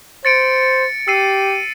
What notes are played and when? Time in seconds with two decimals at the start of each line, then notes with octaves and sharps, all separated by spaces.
0.25 C5 A6 C#7 D7
1.08 G4 E6 C7 D#7